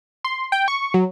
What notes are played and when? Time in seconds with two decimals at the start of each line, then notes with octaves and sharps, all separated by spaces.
0.24 C6
0.52 G5
0.68 C#6
0.94 F#3